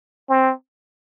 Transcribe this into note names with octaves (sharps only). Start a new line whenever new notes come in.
C4